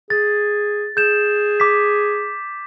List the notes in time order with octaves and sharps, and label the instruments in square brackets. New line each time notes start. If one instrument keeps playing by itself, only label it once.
[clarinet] G#4 [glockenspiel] A6
[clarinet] G#4 [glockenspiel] G6 E7
[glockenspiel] D6 B6